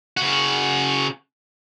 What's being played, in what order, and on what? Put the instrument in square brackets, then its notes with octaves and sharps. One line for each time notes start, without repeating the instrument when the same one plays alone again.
[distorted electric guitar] C#3 F#4